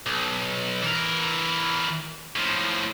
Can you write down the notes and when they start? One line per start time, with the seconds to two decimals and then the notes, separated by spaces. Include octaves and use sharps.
0.06 B1
0.82 E3 A#4
2.36 A2 F3